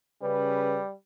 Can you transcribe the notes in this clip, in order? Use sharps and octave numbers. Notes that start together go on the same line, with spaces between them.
C#3 G3 B4